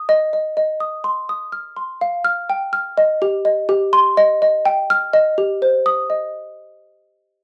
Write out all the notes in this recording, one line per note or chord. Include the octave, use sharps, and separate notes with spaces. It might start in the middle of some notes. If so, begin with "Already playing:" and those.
Already playing: D#6
D#5
D#5
D#5
D#6
C6
D#6
F6
C6
F5
F6
G5
F6
D#5
G4
D#5
G4
C6
D#5
D#5
G5
F6
D#5
G4
C5
D#6
D#5